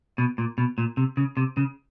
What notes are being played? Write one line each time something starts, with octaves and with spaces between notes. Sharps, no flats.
B2
A#2
B2
A#2
C3
C#3
C3
C#3